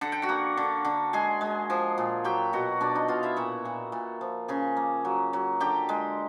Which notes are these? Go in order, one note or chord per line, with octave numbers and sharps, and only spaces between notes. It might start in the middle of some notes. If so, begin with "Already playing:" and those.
D3 F#5
G5
F#4 F#5
A#3
D3
D3
G#3 G#4 G#5
G#3
F3
A#2
F#3 G4 G5
B2 F#4 F#5
B2 D4 D5
D#4 D#5
B2 F4 F5
E4 E5
A#2 F#4 F#5
A#2
A#2
F3
C#3 G#4 G#5
A#3
F#3
F#3
D3 G4 G5
G#3